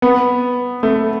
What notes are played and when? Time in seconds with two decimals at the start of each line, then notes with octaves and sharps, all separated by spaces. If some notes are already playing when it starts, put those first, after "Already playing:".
0.02 B3
0.83 A3